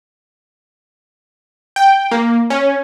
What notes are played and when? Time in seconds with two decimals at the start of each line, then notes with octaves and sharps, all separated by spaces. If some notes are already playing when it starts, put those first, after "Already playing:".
1.76 G5
2.11 A#3
2.50 C#4